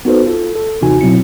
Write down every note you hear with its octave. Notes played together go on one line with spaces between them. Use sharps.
B3 D#4 F#4 A4 B4 C5
F4 A4
A4
D#2 C3 E3 D#4 F#4 G#5
B2 F#3 C4 E4 C#7